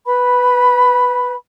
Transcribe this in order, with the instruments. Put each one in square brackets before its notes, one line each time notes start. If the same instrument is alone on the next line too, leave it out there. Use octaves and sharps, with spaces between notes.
[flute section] B4 B5